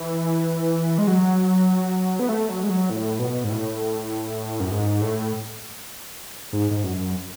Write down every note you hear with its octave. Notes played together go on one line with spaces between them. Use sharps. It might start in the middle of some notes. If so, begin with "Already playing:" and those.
Already playing: E3
G#3
F#3
B3
A3
F#3
G#3
F#3
A2
B2
G#2
A2
F#2
G#2
A2
G#2
G#2
F#2